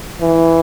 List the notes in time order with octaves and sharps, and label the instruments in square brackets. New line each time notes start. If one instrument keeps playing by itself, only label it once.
[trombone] E3